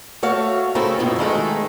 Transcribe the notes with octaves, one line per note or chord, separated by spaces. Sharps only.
A3 F#4 C#5 F5
C#3 A3 A#3 C4 E4 A4
F#2 B2 D#3 E4 F4
D#3 G#3 A3 A4